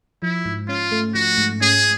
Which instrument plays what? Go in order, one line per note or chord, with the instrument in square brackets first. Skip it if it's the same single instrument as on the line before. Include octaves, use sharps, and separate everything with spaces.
[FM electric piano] F3 [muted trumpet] E4
[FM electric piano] G#2
[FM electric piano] C#4 [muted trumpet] F4
[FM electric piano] A3
[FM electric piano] F3 [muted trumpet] F#4
[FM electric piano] G#2
[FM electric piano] C#4 [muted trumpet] G#4